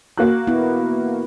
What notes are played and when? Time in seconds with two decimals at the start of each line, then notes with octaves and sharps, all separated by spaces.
0.18 A#3 F#4 F#6
0.47 B3 E4